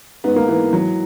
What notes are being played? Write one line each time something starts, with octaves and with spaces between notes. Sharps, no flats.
G#2 B3
A#3
E3 B3
F#3